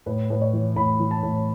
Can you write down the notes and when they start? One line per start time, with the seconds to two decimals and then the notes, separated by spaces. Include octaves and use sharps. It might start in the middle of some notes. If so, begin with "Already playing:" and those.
0.06 A2 B4
0.30 A2 B4
0.41 C#5
0.53 E3
0.76 A2 B5
1.00 E3
1.11 A5
1.23 A2